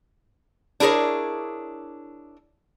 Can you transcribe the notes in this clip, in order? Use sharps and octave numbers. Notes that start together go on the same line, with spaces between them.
D4 E4 G#4 A#4 C#5